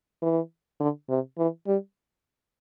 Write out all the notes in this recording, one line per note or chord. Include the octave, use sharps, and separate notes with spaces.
E3
D3
C3
E3
G3